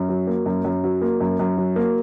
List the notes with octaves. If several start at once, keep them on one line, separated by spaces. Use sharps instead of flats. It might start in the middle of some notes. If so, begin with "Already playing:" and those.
Already playing: F#2
F#3
A#3
F#2
F#2
F#3
A#3
F#2
F#2
F#3
A#3